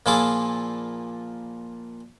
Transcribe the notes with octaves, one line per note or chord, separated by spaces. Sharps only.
A#2 F3 E4 F4 G#4 D6